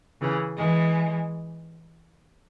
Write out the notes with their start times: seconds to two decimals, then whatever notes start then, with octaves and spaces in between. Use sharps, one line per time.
0.20 C#3 E3
0.57 E3 G#3